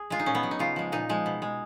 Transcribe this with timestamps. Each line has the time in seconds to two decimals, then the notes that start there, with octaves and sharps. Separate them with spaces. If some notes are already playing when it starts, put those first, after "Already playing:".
Already playing: G#4
0.10 G#3 F4
0.19 D#4
0.26 A#2 C#4
0.35 B3
0.43 F#3
0.51 D#4
0.59 C#3 F4
0.76 F3 G#3
0.92 A#2 D#4
1.09 F3 G#3
1.26 B2
1.42 G#3